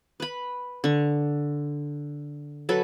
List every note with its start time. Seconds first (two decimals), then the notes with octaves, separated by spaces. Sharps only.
0.20 B4 B5
0.84 D3 C#6
2.69 F#3 A4 B4